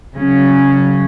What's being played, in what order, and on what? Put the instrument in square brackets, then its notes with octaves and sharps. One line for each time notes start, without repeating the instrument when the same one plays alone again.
[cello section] C#3 F#3 C#4